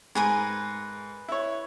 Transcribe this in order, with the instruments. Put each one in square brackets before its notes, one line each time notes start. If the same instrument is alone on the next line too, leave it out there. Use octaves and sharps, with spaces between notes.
[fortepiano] G#2 [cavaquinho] A#4 B4 G#5
[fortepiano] E4 C#5